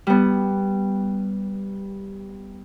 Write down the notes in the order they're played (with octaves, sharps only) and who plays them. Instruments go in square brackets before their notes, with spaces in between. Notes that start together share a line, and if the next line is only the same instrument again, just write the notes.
[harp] G3 B3